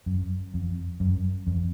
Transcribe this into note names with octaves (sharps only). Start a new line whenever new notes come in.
F#2
F2
F#2
F2